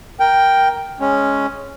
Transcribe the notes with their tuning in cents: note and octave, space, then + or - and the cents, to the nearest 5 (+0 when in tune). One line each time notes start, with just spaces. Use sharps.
A#4 +0 G5 +0
G#3 +0 C#4 +0